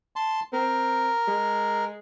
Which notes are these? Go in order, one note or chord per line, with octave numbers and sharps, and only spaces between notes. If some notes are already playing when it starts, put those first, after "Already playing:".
A5 C6
C4 A#4
G#3